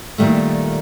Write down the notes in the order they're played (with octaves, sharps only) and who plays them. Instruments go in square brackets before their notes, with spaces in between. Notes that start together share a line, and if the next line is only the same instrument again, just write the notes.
[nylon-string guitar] A#2 D#3 G3 A3